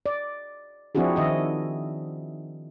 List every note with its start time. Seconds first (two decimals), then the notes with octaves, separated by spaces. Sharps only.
0.06 D5
0.95 F3 C4 D4 E4 F#4 G#4
1.16 D#3 D#5 E5